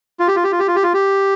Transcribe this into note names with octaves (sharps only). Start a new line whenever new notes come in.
F4
G4
F4
G4
F4
G4
F4
G4
F4
G4